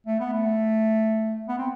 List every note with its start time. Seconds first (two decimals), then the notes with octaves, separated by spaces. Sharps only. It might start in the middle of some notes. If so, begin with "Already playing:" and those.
0.06 A3
0.19 B3
0.33 A3
1.48 B3
1.59 C4